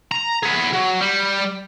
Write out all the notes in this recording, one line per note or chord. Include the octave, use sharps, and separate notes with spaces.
A#5
B3 G#4
F#3
G3